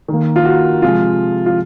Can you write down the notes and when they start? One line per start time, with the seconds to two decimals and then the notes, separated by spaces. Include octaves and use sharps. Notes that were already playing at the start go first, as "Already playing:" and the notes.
0.08 D#3 A#3
0.36 F4
0.45 F#4
0.82 C3 F3 G#3 F4
1.46 F4